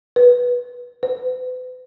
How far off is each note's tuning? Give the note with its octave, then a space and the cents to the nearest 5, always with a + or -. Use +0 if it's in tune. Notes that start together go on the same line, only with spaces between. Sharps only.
B4 -10
B4 +40